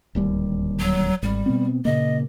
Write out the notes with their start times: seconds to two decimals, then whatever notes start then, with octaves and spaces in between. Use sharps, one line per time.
0.15 D1 D#2 G3
0.80 F#3
1.23 G#1 G3
1.46 B2 B3 C4
1.85 A#2 C#3 A#3 D#5